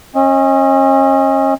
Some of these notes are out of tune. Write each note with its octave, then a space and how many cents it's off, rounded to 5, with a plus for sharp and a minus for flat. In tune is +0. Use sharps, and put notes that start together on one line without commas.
C#4 -35 D#5 +20